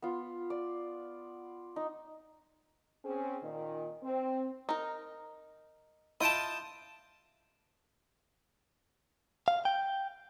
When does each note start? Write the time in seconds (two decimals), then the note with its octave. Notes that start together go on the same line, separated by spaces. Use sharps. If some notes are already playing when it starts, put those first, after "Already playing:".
0.02 B3 F4
0.50 D5
1.76 D#4
3.05 C4 C#4 G#4
3.42 A#2 D#3
4.03 C4
4.69 D#4 A#4
6.21 E4 F4 D#5 G5 A5
9.48 F5
9.65 G5